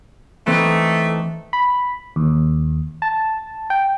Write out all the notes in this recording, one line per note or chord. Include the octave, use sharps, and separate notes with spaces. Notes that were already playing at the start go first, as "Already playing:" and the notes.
E3 A3 C4 D#4
B5
D#2
A5
G5